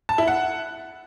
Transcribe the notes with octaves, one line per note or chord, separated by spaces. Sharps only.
A5
E4
F#5